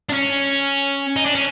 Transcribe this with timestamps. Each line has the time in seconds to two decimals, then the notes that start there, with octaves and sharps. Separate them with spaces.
0.09 D4
0.13 C#4
1.16 D#4
1.26 D4
1.35 C#4